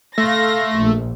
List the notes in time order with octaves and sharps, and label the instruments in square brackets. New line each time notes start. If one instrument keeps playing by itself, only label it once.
[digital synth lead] A3 [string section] F5 C6 A#6
[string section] A#1